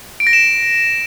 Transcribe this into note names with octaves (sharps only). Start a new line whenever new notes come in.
D7
A#6
E7